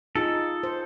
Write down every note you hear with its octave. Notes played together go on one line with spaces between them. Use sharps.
D#4 F4 G#4 A4
C5